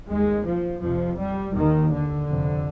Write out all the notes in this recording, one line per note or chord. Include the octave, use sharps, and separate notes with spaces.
D#2 G#3
F3
F2 C3 F3
G3
D#2 D#3
D3
F2 C3